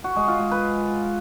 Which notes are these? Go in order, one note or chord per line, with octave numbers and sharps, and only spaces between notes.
F#4
G#3
F4
G#3
B4